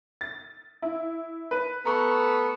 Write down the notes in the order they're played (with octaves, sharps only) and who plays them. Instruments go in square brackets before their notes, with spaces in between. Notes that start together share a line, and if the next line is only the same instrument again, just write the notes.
[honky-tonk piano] A6
E4
B4
[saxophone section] A3 B3 [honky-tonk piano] A#5 C#6